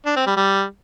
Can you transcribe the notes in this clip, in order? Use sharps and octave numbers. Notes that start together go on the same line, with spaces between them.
D4
C4
G3
G3